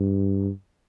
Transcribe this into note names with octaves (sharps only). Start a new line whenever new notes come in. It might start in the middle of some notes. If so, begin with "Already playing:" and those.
Already playing: G2